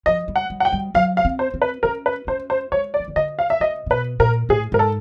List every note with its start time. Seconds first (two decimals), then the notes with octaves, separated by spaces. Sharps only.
0.06 F3 D#5
0.28 G3
0.36 F#5
0.50 G3
0.60 F#5
0.65 G5
0.72 G3
0.95 F#3 F5
1.17 F5
1.25 C4
1.39 C5
1.54 C4
1.62 B4
1.83 C#4 A#4
2.06 B4
2.27 C#4 C5
2.50 C5
2.72 G#3 C#5
2.94 D5
3.00 E3
3.08 D#3
3.16 D3 D#5
3.39 F5
3.50 E5
3.60 C#3 D#5
3.86 C3
3.90 B2 B4
4.20 A#2 A#4
4.49 A2 G#4
4.72 G#2 A#4
4.79 A4